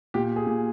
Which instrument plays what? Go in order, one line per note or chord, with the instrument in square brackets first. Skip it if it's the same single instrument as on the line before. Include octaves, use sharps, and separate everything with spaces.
[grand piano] A#2 G4
G#4
A#2